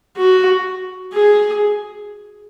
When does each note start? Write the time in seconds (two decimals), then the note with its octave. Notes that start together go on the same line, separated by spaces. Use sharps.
0.17 F#4
1.13 G#4